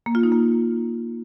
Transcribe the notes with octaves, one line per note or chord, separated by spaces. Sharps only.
A#3
F4
D#4
A#3